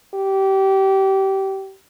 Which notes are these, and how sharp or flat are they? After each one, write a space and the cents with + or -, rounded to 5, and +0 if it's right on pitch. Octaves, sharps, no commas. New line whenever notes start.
G4 -25